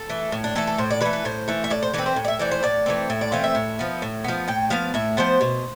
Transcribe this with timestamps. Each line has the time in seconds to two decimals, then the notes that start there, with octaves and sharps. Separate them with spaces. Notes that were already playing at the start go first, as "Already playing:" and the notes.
Already playing: A4
0.10 E3 A3
0.32 A2
0.44 D4
0.55 E3 A3 A4
0.67 A4
0.78 A2 C5
0.90 D5
1.01 E3 A3 B4
1.13 B4
1.25 A2 C5
1.48 E3 A3
1.64 E5
1.70 A2 D5
1.83 C5
1.94 E3 A3 C4 B4
2.06 C5
2.16 A2
2.25 D5
2.28 E5
2.39 E3 A3 C4 D5
2.51 C5
2.63 A2 D5
2.86 E3 A3 C4
3.10 A2 E5
3.21 D5
3.32 E3 A3 C4 F5
3.44 E5
3.55 A2
3.79 F3 B3
4.02 A2
4.24 F3 B3
4.48 A2 G5
4.70 F3 B3 F5
4.94 A2 E5
5.17 F3 B3 C5
5.41 B2